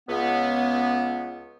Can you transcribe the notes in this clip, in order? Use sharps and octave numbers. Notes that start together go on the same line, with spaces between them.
C#2 B3